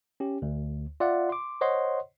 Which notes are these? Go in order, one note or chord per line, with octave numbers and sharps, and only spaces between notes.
C#4 G4
D2
F4 D5 E5 F#5
C6 D6
C5 C#5 D#5 F#5 C6